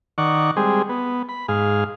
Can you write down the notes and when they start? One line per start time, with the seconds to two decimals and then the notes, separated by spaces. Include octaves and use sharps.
0.18 D#3 D5 F#5 C#6
0.57 G3 G#3 C4 G#4
0.89 B3
1.29 B5
1.48 G#2 G#4 F5